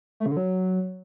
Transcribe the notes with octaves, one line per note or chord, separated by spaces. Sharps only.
A3
C#3
D3
F#3